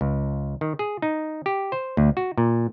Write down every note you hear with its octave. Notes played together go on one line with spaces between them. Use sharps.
C#2
D#3
G#4
D#4
G4
C5
D2
F#4
A#2